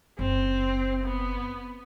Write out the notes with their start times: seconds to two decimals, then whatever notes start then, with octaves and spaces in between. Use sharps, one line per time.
0.19 F#1 C4
1.04 B3